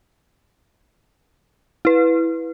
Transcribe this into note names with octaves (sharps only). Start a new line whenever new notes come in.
E4 B4